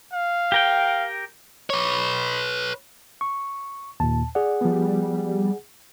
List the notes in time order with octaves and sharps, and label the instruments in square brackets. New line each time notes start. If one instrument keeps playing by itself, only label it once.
[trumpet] F5
[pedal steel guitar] G4 A#4 G5
[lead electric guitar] B4 C#5
[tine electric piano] C#6
[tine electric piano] D#2 A#2 [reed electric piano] A5
[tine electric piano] G#4 F#5 [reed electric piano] D5
[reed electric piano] F3 B3 [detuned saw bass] G3